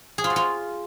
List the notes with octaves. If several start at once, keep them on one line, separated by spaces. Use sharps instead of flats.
G#4
F4
F#4
F4